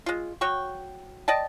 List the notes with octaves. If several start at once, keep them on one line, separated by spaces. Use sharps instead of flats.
G#3 F4
F#3 C#5 G5 C#6
D5 D#5 G5 A5